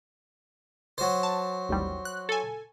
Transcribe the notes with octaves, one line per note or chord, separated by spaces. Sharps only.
F#3 C5
A5
A1 D#2 G3
F#6
A4 G#5